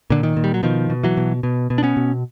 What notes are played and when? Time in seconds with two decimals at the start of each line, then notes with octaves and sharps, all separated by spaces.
0.10 A#2 D3
0.23 D#3
0.36 A#2
0.44 G3
0.54 F#3
0.63 B2 D#3 F3
0.90 B2
1.03 E3 F#3
1.17 B2
1.43 B2
1.70 B2
1.78 D4
1.83 B3 C#4
1.97 B2